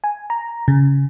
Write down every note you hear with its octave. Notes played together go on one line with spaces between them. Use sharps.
G#5
A#5
C#3